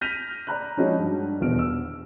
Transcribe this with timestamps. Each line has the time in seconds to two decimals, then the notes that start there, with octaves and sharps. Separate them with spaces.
0.01 F6 G6 A#6 B6 D#7 F7
0.47 D5 A#5 B5 F#6
0.77 F3 G#3 C#4 D#4 F#4
0.99 G2
1.41 D#1 E2 B2 F6 D7
1.59 E6